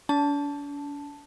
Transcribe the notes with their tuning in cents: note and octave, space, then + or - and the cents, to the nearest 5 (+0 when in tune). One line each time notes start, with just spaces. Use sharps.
D4 -45 A5 +0